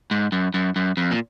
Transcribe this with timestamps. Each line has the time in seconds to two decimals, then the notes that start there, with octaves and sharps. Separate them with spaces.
0.11 G#2
0.32 F#2
0.54 F#2
0.76 F#2
0.97 F2
1.11 A#2